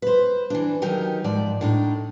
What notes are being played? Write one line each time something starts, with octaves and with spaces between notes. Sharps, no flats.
B4 C5
E3 D4
D#3 F#3 D#4 G4 A#4
G#2 F3 D5
A2 D4 D#4